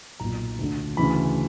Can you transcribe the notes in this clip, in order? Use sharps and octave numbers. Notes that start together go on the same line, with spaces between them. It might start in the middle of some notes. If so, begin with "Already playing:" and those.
B1 A#2 A#5
D2 D3
D2 C#3 E3 B5